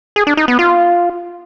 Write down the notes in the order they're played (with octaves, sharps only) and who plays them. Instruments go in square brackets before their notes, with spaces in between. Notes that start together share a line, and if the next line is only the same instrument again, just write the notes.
[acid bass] G#4
D4
D#4
B3
F4